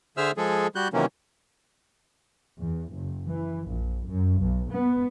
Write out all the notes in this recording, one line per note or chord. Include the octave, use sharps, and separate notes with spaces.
D3 G#4 C5 E5 E6 F6
F3 G#3 G#4 A4
G3 F#4 F#6 G6
C3 D#3 E3 F#3 A#3 C#4
E2
F#1
E3
A#1
F#2
B1
B3